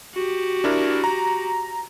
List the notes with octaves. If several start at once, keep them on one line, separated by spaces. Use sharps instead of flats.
F#4 G4
D4 E4 A#4
A#5